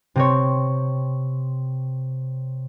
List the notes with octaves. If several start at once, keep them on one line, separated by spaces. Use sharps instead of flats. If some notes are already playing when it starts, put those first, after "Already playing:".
C3 C4 C#5